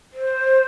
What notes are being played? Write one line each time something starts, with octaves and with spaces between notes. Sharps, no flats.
C5